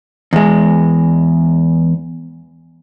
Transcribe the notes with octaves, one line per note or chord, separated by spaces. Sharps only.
E2 G#3